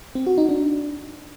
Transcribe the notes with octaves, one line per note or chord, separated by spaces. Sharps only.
C4
F#4
D#4
D4